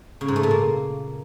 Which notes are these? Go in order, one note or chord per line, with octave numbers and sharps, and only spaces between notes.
C#3
G#2
A3
A#2
A#3